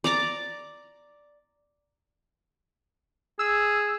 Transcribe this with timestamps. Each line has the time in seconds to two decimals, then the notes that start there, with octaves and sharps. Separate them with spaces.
0.04 D5 A#5 D6
3.39 G#4 E6